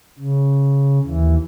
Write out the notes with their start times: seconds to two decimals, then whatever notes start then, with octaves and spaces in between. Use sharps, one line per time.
0.19 C#3
1.05 D#2 E3